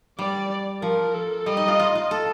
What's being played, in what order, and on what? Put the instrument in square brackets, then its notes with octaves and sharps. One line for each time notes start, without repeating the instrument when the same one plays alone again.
[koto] G3 [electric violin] D5
[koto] F3 [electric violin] A#4
[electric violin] A4
[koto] G3 [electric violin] D#5
[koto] D#4
F4
F4
F4
A4